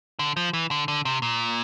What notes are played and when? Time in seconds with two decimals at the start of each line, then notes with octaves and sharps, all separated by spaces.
0.19 D3
0.37 F3
0.53 E3
0.71 D3
0.88 D3
1.05 C3
1.22 A#2